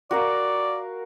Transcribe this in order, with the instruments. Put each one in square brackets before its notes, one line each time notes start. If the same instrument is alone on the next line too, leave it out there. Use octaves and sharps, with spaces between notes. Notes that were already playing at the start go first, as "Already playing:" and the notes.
[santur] F#4 A#4 F5 [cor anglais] D5